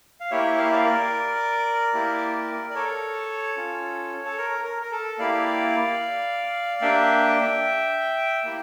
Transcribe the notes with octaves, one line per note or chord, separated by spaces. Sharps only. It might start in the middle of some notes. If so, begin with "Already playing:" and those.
F5
A#3 E4 G4 C#5 E5
F5
E5
D5 F5
A#4 D5
A#3 E4 G4
D5
A4 C#5
C#4 F4
A4
A#4
A#4
A#4
A4
A#3 E4 G4 D5 F5
A#3 D4 G4 E5 G5
A#3 E4 G4